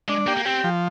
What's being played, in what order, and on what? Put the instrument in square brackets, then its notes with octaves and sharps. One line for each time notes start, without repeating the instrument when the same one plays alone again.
[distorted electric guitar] G#3 [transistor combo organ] D4
[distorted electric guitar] A#3 [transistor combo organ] G4
[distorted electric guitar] A#3
[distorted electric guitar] C4 [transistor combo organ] G4
[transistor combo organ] F3